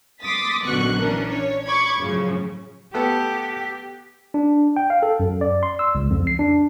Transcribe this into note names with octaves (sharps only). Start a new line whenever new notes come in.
C6 D6 D#6 A6 B6
A#1 F#2 B2 D3 C#6 F#6
E3 C#4 D4 A#4
C#5
B5 C#6 D6 G#6
F#2 A2 C#3 F3 F#3
A3 B3 G4 A4
D4
G5
F5
A4
F#2
D5
C6
E6
C#2
F2
C7
D4